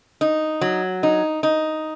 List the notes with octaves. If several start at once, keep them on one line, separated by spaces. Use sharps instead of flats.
D#4
F#3
D#4
D#4